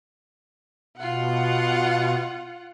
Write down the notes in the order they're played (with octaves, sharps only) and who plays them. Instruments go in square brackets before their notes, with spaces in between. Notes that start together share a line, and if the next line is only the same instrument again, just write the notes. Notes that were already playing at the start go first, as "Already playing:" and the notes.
[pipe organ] B2 [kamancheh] F4 F#5